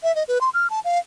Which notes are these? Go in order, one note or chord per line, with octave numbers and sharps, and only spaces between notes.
E5
D#5
B4
C6
F6
A5
F5